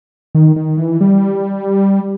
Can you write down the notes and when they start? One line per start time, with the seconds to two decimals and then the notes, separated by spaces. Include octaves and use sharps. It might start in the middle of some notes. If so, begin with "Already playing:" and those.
0.35 D#3
0.56 D#3
0.77 E3
1.01 G3